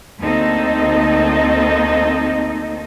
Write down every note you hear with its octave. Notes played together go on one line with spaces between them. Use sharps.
D2 A#3 C4 D#4 A4 D#5